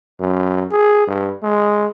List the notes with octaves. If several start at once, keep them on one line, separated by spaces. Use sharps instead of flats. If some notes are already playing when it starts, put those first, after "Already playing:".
F#2
G#4
G2
G#3